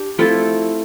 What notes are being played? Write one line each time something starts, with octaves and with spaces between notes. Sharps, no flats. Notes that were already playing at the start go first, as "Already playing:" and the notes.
Already playing: D4 G4
F3 A3 C4 E4 F4 A4